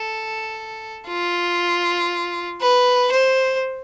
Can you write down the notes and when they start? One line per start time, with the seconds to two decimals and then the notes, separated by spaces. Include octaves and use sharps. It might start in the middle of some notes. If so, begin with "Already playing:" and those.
Already playing: A4
1.07 F4
2.61 B4
3.12 C5